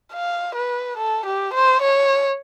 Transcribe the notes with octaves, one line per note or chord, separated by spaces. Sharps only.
F5
B4
A4
G4
C5
C#5